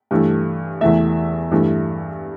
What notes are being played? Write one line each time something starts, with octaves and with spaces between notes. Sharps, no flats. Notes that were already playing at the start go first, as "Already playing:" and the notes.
G2 E3 A3
E2 E3 A3 E5
G2 E3 A3